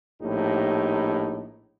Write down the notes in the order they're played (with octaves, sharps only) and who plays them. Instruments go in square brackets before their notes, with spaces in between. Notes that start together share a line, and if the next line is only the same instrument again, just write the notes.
[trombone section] A#1 A2 D#4 G4